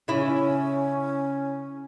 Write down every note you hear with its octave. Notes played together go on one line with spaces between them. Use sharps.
C#3 C#4 E4